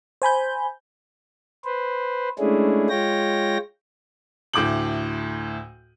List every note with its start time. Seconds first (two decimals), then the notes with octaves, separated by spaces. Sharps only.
0.22 C5 G#5 B5 G6
1.65 B4 C5
2.39 G#3 A3 C#4 D4 E4 G#4
2.89 G#3 F4 C#5 G5 A#6
4.53 D2 A2 D6 G6 F#7